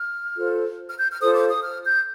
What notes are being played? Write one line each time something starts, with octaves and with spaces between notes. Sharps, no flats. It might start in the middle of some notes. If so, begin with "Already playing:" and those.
Already playing: F6
F4 A4 C5
F6
G6
F6
F4 A4 C5 D#6
D6
D#6
F6
G6